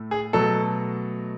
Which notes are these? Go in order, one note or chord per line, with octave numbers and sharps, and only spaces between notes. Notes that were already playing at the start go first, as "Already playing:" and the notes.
Already playing: A2 A3
G#4
B2 F#3 A3 A4